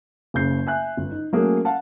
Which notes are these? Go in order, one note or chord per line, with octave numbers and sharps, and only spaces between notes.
F#1 C#3 G6 C7
E5 G#5 F#6
G1
D#4
F#3 A3 A#3 C#4 G#4
F5 F#5 A5